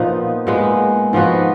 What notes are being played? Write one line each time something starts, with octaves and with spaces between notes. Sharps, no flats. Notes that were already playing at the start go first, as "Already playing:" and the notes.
Already playing: A#2 F3 B3 D#4
A#2 G#3 B3
G#2 F3 B3 F#4